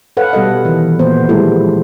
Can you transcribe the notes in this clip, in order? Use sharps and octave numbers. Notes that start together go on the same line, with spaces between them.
A4 B4 C#5 F5 F#5
B2 G3 A4 D#5
D#3 E3
A#2 B3 C5
F3 G3 G#3 E4 A4